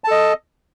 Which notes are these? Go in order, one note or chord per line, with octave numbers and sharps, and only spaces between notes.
A4 D#5 A5